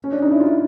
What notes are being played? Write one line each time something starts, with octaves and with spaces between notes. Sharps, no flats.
C#4
D4
D#4
E4
F4